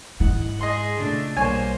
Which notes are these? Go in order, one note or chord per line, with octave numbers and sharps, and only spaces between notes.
G#2 G#3 E4 F#5
G#4 D#5 C6
A#2 C#3 A3 D4
B1 G3 A#3 C5 C#5 G#5